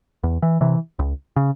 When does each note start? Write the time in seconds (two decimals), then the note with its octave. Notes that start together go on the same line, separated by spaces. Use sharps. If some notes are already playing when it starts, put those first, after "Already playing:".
0.23 E2
0.42 E3
0.61 C3 E3
0.99 C#2
1.36 C#3